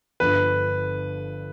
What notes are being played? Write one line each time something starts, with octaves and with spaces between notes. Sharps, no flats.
G1 G2 D3 F3 B4